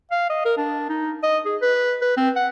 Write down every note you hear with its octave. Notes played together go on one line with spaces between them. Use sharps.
F5
D#5
A#4
D4
D#4
D#5
G#4
B4
B4
C4
F#5